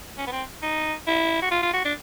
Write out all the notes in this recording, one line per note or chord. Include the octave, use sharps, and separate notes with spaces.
C#4
B3
C4
D#4
E4
F#4
F4
F4
F#4
D4